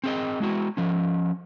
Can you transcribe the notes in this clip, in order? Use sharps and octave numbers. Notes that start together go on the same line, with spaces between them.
C4 G#4 D#5
G#3 E4 F#4
F3 C#4